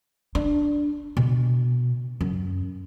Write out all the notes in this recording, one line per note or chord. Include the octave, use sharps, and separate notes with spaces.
D4
B2
F#2